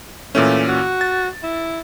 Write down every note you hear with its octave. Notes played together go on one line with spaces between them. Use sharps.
A#2 E3 A3 C#4
F#4
A6
E4